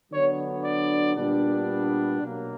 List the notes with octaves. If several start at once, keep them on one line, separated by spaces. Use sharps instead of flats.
D3 F#3 B3 D4 C#5
D5
A#2 G3 B3 D4
B2 F#3 A#3